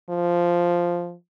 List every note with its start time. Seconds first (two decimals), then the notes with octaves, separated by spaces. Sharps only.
0.10 F3